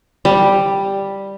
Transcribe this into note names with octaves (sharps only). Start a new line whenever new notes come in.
G3